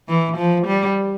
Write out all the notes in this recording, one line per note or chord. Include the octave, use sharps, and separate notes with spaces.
E3
F3
G3